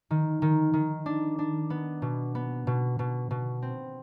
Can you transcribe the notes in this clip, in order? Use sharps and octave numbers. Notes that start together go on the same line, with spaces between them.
D#3
D#3
D#3
D4
D4
B3
B2
B3
B2
B2
B2
C4